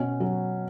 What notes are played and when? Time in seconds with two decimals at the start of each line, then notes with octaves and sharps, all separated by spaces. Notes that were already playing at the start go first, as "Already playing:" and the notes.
Already playing: B2 C#4
0.20 F#3